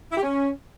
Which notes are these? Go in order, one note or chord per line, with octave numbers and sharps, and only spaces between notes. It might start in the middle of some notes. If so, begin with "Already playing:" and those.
E4
G4
C#4